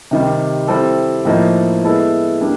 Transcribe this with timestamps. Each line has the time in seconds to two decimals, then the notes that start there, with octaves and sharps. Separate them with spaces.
0.11 C3 D#3 G3
0.68 G3 C4 E4 A4
1.25 A2 F3 A#3 D#4
1.83 G#3 B3 E4 A4
2.41 G3 A#3 D4